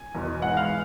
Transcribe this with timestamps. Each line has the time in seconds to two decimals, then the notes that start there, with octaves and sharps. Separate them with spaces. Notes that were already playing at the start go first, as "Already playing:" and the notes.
Already playing: G#5
0.14 F#1 E2 B2
0.42 G#2 E3 G#3 F#5
0.57 F5